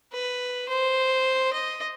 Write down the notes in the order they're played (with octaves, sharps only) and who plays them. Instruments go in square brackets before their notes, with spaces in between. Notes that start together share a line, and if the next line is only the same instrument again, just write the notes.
[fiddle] B4
C5
D#5